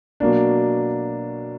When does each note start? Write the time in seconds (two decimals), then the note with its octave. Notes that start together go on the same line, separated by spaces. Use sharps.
0.20 B2 F#3 A#3 D4